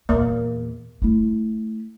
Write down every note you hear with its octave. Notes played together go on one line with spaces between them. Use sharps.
E2 A#2 A#3
A3 E4